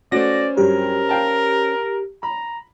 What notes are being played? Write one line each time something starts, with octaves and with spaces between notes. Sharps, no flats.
A3 C#4 F#4 C5 D5 A#6
G2 F#3 G4 A#4
F5 G5 A5
A#5 B5